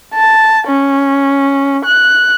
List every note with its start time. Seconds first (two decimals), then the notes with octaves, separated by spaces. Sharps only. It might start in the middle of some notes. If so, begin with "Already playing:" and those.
0.14 A5
0.67 C#4
1.85 F#6